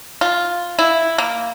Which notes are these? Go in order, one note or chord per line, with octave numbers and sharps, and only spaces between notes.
F4
E4
A#3